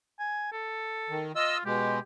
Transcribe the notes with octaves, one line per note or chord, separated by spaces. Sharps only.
G#5
A4
D#3
F4 D#5 E6
B2 G#3 G4